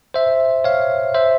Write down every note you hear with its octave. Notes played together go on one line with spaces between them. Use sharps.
C5 E5
C#5 F5
C5 E5